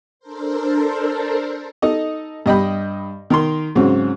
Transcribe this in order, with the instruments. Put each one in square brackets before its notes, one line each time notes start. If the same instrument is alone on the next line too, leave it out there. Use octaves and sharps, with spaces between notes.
[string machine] D4 A4 A#4 C5
[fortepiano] D#4 A4 D#5
G2 D#5 G5 B5
D#3 A#4 C6
G#2 C#3 F#3 C4 C#4